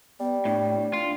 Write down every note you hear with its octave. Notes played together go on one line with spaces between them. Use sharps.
G3 B3
A2 D4
D4 F4